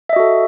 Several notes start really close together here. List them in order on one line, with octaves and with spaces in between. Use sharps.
E5 D#5 F#4 A4